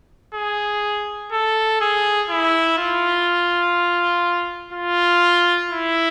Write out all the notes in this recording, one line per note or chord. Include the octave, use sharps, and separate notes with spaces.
G#4
A4
G#4
E4
F4
F4
E4